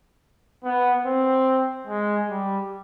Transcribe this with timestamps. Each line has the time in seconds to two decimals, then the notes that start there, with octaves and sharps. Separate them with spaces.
0.64 B3
1.06 C4
1.87 G#3
2.29 G3